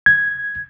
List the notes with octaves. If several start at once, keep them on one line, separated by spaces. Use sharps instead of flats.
G#6